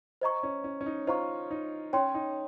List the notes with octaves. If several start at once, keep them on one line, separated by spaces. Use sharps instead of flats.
C5 D#5 A#5 C#6
C#4
C#4
C#4
D#4
F4 C5 D#5 A#5 C#6
D#4
C#4 C#5 G5 C6
D#4